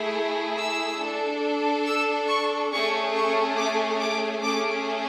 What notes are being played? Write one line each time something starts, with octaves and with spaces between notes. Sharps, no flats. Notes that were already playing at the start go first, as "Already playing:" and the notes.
Already playing: A3 E4 G#4
E6
D4 A4
E6
C#6
A3 C#4 G#4 C#6
C#6
D6
D6
A3 C#4 G#4 D6